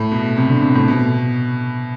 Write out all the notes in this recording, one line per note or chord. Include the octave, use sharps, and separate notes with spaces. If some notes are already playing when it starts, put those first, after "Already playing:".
Already playing: A2
B2
C3
D3
C3
A2
B2